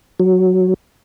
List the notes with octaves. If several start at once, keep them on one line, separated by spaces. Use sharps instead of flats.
F#3